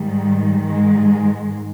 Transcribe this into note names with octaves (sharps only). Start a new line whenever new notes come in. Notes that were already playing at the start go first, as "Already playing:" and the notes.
Already playing: G#2 D#3 G3
G#2 G#3